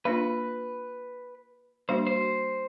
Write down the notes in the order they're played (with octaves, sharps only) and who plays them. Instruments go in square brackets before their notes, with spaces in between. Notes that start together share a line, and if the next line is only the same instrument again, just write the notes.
[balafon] A#3 D4 F4 [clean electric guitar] B4
[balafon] G3 A#3 D4 F#4 [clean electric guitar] C5
[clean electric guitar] C5